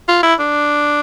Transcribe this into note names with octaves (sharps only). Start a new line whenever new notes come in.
F4
E4
D4